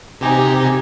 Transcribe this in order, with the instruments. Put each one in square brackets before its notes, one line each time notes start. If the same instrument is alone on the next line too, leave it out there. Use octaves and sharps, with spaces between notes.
[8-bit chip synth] C3 G4 [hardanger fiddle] D#4 G#5